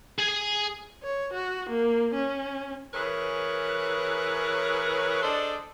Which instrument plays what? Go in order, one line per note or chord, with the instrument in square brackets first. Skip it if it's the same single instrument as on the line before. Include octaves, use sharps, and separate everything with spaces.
[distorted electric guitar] G#4 G#5
[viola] C#5
F#4
A#3
C#4
[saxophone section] E3 G#4 A#4 B4 C#5
D4 G#4 A4 C5 D5 D#5